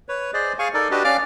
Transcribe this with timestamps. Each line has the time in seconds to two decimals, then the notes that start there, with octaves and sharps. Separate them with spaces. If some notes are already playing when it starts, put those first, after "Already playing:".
0.09 B4 C#5
0.34 G#4 C5 D5 D#5
0.59 G#4 F5 G#5 C#6
0.74 D#4 A4 A#4 D5
0.91 D4 F#4 G4 B4 D#5
1.04 C#4 D5 F5 D6 F6